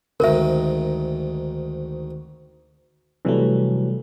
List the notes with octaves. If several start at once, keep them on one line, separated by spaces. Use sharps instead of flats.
D2 G#2 D#3 A#4 E5
C3 E3 F#3 G3 A3